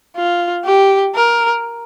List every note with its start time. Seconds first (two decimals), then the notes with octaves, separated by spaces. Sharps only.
0.16 F4
0.65 G4
1.15 A#4